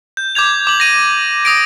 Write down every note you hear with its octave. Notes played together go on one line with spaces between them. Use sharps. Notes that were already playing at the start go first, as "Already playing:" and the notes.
G6
D6 G6 G#6 F7
D6 F#7
A#6 D#7
D#6 A#6 D7